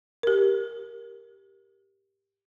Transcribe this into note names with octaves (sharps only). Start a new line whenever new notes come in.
G4 A#4